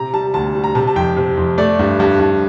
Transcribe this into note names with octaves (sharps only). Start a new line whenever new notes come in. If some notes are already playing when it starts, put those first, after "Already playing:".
Already playing: C3 A#5
G3 A5
D2 A5
G3
A#5
C3 A5
A5
F2 G5
C3
F2
A3 D5
G2
G2
G2